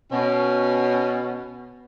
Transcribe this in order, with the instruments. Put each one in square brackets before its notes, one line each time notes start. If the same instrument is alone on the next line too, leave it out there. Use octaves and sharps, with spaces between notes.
[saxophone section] B2 [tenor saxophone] C#4